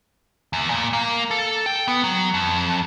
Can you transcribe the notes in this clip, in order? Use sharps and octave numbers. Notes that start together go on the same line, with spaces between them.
E2
A#2
A#3
A4
G5
B3
F#3
F2